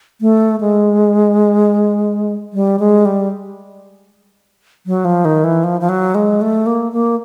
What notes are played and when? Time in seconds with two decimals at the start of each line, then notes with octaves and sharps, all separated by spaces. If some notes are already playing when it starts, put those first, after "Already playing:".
0.21 A3
0.61 G#3
2.53 G3
2.80 G#3
3.05 G3
4.87 F#3
5.05 F3
5.25 D#3
5.44 E3
5.64 F3
5.81 F3
5.89 F#3
6.15 G#3
6.41 A3
6.66 A#3
6.92 A#3